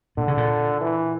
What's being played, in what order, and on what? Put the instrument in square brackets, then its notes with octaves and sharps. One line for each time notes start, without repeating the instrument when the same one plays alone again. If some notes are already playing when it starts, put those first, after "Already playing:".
[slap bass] A#2 [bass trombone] D3
[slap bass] C#3
A#2
[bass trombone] E3